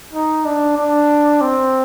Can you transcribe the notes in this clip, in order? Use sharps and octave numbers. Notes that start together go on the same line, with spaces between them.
D#4
D4
D4
C4